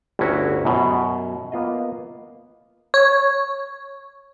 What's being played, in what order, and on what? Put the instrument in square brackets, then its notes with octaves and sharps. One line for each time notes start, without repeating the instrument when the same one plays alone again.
[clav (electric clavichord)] G1 D2 A2 C#4 E4 F#4
F#2 B2
A#3 B3 F4 D#5
[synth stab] C#5